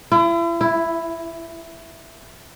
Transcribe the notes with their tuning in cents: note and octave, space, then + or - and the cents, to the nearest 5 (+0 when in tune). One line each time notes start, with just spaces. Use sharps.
E4 +40
E4 +5